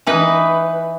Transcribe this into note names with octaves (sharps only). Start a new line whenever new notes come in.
E3 D#4 B4